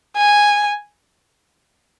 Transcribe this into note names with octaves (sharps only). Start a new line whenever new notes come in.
G#5